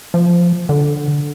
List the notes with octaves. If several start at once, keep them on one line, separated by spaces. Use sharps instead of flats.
F3
D3